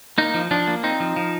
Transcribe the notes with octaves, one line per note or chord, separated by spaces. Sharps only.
A#3 D#4
F3
F3 D4
A#3
C4 D#4
F3
F3